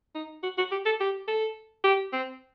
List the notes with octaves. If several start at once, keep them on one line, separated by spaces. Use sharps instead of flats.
D#4
F#4
F#4
G4
A4
G4
A4
G4
C4